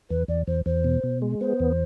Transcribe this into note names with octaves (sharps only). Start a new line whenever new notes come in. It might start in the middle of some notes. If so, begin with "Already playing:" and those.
E2 B4
E2 D5
E2 C5
E2 C5
B2
B2
G#3
B3 C5
E2